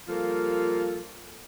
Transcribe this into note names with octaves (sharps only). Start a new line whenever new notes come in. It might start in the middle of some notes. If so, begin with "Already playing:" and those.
F3 G3 A#3 F4 A4